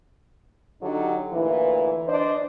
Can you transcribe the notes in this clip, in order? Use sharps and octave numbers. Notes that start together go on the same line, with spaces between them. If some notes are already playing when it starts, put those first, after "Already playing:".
D3 F#3 D4 D#4 G4
D2 A#2 E3
D4 C5 D5 D#5